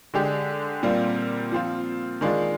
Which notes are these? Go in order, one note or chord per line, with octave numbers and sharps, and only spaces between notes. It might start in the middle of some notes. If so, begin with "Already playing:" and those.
D3 G#3 D4 G4
A#2 G3 C4 F4
F3 C4 F4
D#3 G#3 D4 F4